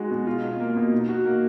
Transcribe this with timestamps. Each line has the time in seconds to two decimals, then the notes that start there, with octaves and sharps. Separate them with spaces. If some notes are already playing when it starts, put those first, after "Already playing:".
Already playing: G#3 D#4 F#4
0.11 B2
0.27 F4
0.43 B2
0.60 A#3
0.76 B2
0.92 D#4
1.09 F#4
1.25 A#3